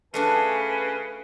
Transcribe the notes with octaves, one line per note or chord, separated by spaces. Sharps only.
C#3 A3 D4 F#4 B4 G#5